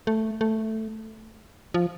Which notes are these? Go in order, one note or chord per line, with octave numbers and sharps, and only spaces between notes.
A3
A3
F3